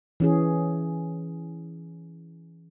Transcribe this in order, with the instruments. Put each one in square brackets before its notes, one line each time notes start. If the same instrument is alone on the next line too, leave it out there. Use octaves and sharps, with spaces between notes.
[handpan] E3 C#4 G#4